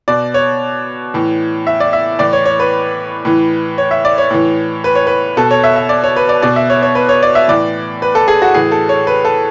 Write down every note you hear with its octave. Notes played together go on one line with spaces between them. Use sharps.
B2 D5
C#5
A2 E3
E5
D5
E5
A2 E3 D5
C#5
C#5
B4
A2 E3
C#5
E5
D5
C#5
A2 E3
B4
C#5
B4
B2 A4
C#5
E5
E5
D5
C#5
B4
D5
B2 D5
E5
C#5
C#5
B4
C#5
D5
E5
A2 E3 D5
B4
A4
G#4
F#4
A2 E3 G#4
A4
C#5
B4
A4